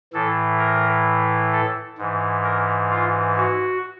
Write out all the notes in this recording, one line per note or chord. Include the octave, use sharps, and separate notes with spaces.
A2 E3 A4
A#4
A4
G#2 E3
A#4
F4
F#4